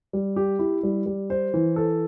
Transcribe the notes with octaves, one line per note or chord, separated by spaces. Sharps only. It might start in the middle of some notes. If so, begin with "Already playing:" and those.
G3
G4
E4
G3
G3
C5
E3
A4